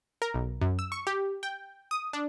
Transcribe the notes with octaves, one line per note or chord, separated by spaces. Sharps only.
A#4
B1
F#2
E6
C#6
G4
G5
D#6
D4